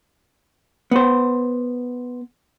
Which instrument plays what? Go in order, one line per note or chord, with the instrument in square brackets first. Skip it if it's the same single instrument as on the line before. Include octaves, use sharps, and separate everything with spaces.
[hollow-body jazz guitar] B3 C5